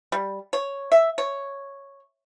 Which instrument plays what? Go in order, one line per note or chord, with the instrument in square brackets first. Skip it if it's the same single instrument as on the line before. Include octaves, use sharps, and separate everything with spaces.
[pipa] G3
C#5
E5
C#5